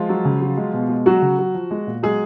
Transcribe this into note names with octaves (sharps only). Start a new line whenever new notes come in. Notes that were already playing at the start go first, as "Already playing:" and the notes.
Already playing: F3 G#3 F4
F#3
C#3
F#3
G#3
B2
G#3
F#3 F#4
C#3
F#3
F3
G#3
A#2
F#3 G#3 G#4